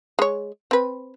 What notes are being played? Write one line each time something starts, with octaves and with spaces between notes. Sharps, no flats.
G#3 C#5
C4 B4